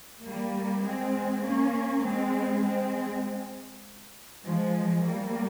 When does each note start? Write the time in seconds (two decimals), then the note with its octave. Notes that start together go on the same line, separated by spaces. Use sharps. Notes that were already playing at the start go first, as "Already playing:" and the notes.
0.23 G3 A#3
0.82 G#3 C4
1.43 A#3 C#4
2.03 G#3 C4
2.63 G#3 C4
4.43 F3 G#3
5.04 G3 A#3